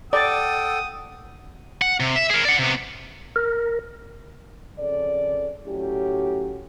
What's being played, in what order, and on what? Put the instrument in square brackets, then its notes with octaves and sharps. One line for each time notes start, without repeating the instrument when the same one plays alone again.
[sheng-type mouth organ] A4 G5 [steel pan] D5 [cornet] F#5 [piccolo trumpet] D#6
[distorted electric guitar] F#5
C3
E5
G#4 A#4
D5 F#5
C3 B3
[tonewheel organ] A#4
[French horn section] F2 C#3 A4 D5
A2 F#3 C#4 G4